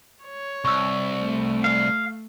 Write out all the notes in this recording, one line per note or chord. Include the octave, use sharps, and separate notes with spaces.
C#5
C2 C#6 E6
A3
F5